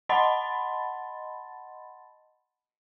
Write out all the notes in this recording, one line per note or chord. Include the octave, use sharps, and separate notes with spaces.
D#5 F#5 A5 B5 C6 A6